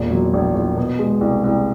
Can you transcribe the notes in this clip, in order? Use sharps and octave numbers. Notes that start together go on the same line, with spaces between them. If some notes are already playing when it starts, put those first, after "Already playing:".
Already playing: E1 A#2
F#3
A#1
A#1
B2
G#3
C2
C2